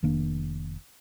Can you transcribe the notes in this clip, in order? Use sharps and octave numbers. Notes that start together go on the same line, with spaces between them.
F1 D#3 A#3 D4